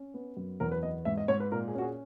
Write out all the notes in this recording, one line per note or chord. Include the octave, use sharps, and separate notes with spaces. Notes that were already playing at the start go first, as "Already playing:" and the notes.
Already playing: C#4
B3
F#2
E2 A#4
B4
B3 D#5
G#2 E5
D#5
G#2 C#5
B4
A#2 A#4
G#4
C#4 F#4
G#4